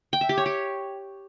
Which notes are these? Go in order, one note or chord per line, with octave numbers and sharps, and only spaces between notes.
G5
E5
G4
C#5
G4